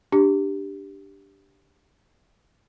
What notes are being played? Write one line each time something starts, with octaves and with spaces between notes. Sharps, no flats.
D4 G4